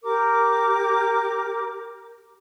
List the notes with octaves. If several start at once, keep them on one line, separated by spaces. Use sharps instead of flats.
G4 A#4 D6